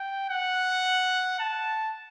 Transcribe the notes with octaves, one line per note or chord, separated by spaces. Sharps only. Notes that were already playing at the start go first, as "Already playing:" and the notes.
Already playing: G5
F#5
A5